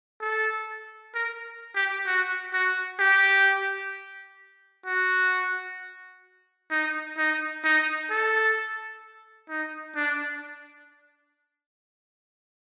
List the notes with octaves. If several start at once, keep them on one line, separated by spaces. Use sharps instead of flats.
A4
A#4
G4
F#4
F#4
G4
F#4
D#4
D#4
D#4
A4
D#4
D4